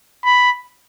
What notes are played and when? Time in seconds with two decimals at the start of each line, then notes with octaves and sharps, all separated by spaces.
0.25 B5